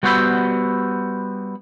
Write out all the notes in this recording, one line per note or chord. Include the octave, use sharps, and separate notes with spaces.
G3 B3 F#4 C5 E5 B5